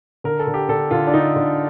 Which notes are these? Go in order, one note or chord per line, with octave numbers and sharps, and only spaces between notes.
D3 A#4
A4
D3
G4
D3 A4
D3 F4
D4
D3 D#4
D3